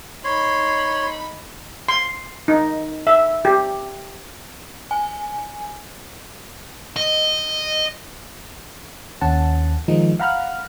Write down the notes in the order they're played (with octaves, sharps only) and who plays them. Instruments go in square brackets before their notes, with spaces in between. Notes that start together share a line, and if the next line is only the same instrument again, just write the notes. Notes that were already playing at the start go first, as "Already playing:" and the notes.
[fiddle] D#4 B5 [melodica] C#5 C6
[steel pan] C6
D#4
E5
G4
[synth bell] G#5
[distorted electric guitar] D#5
[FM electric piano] D#2 C#4 F#5 A5
D#3 F3 G#3 D#4
F5 F#5 A#5 B5 F6 F#6